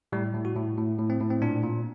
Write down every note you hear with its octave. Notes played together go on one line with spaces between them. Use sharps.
A2 G3
A2
F#4
A2
A2
A2
C4
A2
C4
A#2 D4
A#2